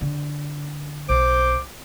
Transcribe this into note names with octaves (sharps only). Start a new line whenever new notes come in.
D3
B1 C5 D6